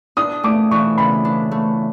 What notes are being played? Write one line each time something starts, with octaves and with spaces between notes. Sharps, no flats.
D4 D#6
A3 D6
E3 C#6
C#3 B5
D4
A3